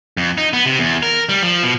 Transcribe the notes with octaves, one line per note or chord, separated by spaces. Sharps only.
F2
D#4
B3
C3
E2
A#4
G3
F3
B2